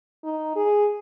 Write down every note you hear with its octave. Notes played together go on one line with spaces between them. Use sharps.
D#4
G#4